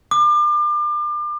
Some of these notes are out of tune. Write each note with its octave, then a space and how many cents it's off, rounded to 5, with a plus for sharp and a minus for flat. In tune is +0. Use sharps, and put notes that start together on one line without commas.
D6 +35